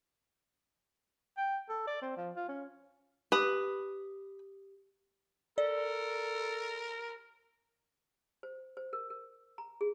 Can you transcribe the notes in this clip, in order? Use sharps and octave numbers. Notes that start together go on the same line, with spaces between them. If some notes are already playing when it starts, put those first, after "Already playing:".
G5
A4
D5
C4
F3
F4
C#4
G4 B4 D#6
A4 A#4 D5
C5
C5
A#4
A#4
A#5
G#4